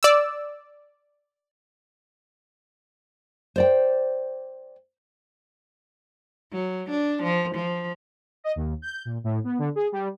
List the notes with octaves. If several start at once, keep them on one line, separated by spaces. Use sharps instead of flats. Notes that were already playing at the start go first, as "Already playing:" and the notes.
D5 E6
C5 D5 G5
F#3
D4
F3
F3
D#5
D#2
G6
A#2
A2
B3
D3
G#4
G3